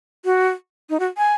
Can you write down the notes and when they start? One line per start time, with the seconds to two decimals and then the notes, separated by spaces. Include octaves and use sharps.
0.25 F#4
0.90 D#4
1.00 F#4
1.18 G#5